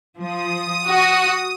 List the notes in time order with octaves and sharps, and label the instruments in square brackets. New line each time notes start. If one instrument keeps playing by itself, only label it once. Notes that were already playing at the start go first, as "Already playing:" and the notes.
[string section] F3 [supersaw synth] D#6
[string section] F#4